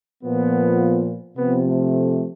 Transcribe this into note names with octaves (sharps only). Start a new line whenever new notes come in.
A#2 F3 B3
C3 F3 B3
A3